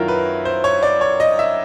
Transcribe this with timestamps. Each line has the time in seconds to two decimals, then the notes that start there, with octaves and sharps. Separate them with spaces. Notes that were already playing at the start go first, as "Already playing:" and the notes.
Already playing: F#2 D#3 F#3 E4 F4 A#4
0.08 B4
0.45 C5
0.64 C#5
0.83 D5
1.01 C#5
1.20 D#5
1.39 E5